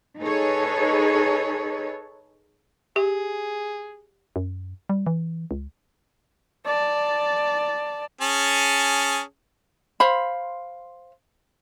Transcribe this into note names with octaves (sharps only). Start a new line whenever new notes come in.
D#4 G#4 A4 B4 C#5
G4 G#4
F#2
G3
E3
C#2
D5 A5
C#4 G#4 A5
C5 F5 B5